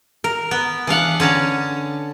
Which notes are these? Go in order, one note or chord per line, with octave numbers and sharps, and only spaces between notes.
A#4
B3
E3 D4 F5 F#5
D3 C#4 A5 A#5